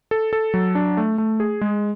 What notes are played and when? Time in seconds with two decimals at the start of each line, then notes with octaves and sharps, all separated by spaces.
0.11 A4
0.33 A4
0.54 F#3
0.75 D4
0.97 A3
1.18 A3
1.40 G#4
1.61 G#3